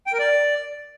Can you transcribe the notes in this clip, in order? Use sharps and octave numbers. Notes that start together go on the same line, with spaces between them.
G5
A#4
D5